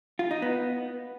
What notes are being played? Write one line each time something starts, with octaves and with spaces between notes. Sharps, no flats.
F4
D#4
B3